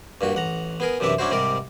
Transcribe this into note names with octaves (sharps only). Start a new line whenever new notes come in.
G2 A#2 F#4
A1 F#5 A#5
B3 G#4 A#4
F#2 C3 E3 D4 E5
C#4 D4 E4 F#4 C5
G#2 C3 G3 A#4 D5